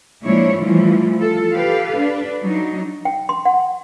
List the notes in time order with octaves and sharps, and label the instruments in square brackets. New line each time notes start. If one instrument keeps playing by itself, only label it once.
[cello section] A#2 F3 G#3 D4 E4 C#5
E3 F3 G3 A3 E4 F4
F4 A4
G4 A4 B4 F5
D4 B4
F#3 D4 D#4
[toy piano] G5
C6
F#5